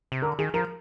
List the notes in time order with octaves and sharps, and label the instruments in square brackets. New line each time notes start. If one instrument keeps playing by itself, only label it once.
[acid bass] C3
[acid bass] D3 [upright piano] A#4
[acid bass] D#3 [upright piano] G#4
[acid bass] F3 [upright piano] A#4